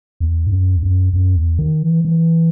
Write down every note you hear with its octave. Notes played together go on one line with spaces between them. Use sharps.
E2
G#2
F#2
E2
F#2
F#2
E2
D#3
E3
E3